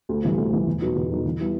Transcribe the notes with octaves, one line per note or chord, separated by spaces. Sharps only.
D2
C3 E3 G3
D2
C3 E3 G3
E2
B2 F#3 B3 D#4
E2
B2 F#3 B3 D#4
E3
G3 B3 E4